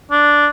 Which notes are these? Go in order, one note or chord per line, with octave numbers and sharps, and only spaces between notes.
D4